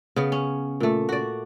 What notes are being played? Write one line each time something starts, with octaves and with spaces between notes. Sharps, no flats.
C#3 B3
C#4
A#2 A3
F#4 D5